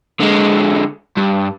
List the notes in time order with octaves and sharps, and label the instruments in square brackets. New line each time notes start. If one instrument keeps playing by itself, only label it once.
[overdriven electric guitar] D3 G#3
G2